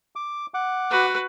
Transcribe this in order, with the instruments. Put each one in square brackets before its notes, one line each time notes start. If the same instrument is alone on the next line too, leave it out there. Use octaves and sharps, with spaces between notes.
[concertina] D6
F#5 D6
[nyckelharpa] F#4 B4